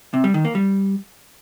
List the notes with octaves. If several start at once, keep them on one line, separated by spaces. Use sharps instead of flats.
C3
G3
D#3
A#3
G3